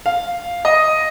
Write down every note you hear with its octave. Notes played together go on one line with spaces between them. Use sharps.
F5
D#5